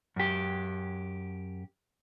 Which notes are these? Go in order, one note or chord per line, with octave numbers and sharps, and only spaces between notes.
F#2 G4